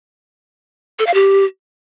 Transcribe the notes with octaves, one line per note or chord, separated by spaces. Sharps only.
A4
F5
G4